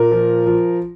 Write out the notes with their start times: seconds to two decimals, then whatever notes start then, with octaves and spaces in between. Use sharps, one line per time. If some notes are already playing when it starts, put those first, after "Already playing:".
Already playing: A#2 A#4
0.11 F3
0.46 F3